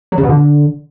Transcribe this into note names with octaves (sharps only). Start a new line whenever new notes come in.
F#3
C#3
B2
D3